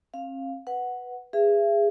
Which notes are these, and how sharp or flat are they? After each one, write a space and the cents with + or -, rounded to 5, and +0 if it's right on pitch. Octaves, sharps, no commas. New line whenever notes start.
C4 +45 F5 +0
B4 +0 F#5 +0
G#4 -20 B4 +15 E5 +40